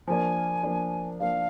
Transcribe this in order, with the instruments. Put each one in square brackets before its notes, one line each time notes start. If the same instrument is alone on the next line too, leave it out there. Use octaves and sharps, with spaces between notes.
[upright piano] F3 A#3 D4 [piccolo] G#5
[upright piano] F3 A#3 D4
[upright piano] F3 A#3 D4 [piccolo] F5